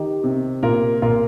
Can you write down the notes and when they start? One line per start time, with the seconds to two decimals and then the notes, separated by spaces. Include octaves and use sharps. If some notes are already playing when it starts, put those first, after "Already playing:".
Already playing: D#3 D#4 G4
0.24 C3
0.63 A#2 F4 A#4
1.02 A#2 F4 A#4